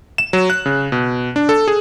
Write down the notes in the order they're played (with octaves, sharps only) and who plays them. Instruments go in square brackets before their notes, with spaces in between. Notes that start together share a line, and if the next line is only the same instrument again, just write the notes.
[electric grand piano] E7
F#3
F#6
C#3
B2
D4
A4
G#4